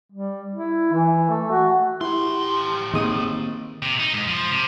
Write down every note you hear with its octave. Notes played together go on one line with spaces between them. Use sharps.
G3
E4
E3
A3
F#4
A2 E4 G4 C6
D#3 A#3 C4 D#4 G#4 D#6
C3
D#4
G#2
F3
C3